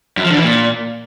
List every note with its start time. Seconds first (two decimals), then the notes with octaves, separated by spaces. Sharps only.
0.17 F#2
0.24 F3
0.31 D3
0.37 E3
0.44 A#2